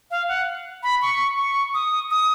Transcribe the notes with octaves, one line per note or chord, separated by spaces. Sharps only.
F5
F#5
B5
C#6
C#6
D#6
D#6